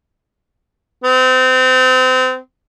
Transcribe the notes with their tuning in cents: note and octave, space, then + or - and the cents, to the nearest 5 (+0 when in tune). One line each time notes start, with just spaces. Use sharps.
C4 -30